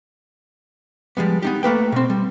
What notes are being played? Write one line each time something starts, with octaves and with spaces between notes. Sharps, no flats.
F3 G3 G#3 B3
B3 D#4 G4
A3 A#3 B4 G5
B2 C4
G3